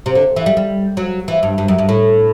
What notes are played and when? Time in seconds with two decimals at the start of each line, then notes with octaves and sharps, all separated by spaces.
0.06 C3
0.15 D3
0.36 E3
0.46 G3
0.57 G3
0.97 F#3
1.28 E3
1.43 G2
1.58 G2
1.68 F#2
1.78 G2
1.89 A2